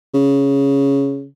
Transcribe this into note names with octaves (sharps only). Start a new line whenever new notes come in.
C#3